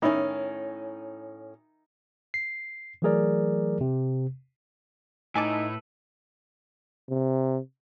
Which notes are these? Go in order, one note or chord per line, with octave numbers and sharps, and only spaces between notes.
A2 D#3 C#4 D#4 E4
C7
E3 F#3 A3 G#4 A#4 D5
C3
A2 D#4 A4 B4 E5 G#5 A5 D6
C3